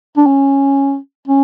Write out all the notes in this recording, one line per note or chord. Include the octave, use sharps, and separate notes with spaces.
D4
C#4
C#4